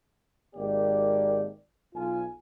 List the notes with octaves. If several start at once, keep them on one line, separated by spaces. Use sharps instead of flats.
G#1 A#3 G4 D5
B1 F4 G#5